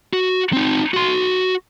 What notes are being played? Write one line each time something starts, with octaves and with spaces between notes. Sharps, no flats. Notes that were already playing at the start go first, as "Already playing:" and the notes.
F#4
C4 D#4
F#4 C6